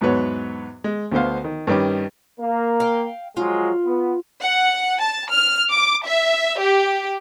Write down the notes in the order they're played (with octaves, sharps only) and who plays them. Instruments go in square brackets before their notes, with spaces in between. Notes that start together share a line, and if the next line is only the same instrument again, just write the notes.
[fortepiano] E2 G#2 F#3 B3 B4 C#5
G#3
D2 D3 B3 C5 F5
D#3
G2 D#3 G3 C#4 D6
[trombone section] A#3
[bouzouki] F5 G5
[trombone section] F3 F#3 G#3 [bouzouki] F4
[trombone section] B3
[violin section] F#5
A5
F6
D6
E5
G4